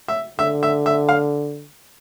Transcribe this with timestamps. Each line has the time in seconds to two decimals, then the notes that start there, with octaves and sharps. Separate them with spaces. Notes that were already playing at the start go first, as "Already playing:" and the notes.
0.08 E5
0.39 D3 E5
0.63 E5
0.86 E5
1.09 F5